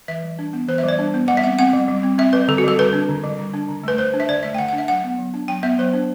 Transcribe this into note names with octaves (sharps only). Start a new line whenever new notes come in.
E3 E5
G3
D4
B3
E3 C5
E5
G3 D5
D4
B3
G3 F#5
E5
C4 F#5
C4 F#5
G3
G3
C4
C4 E5
G3 B4
D3 A4
F#4
G3 A4
D3 B4
D4
D3
G3
D3
D4
D3
A3 B4
D3 C5
D4
E5
D3 D5
A3 E5
G5
D3 F#5
F#5
D4
E5
F#3 F#5
B3
F#3
D4
F#3 G5
B3 E5
F#3 C5
D4